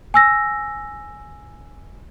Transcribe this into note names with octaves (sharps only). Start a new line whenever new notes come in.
G#5 E6 A#6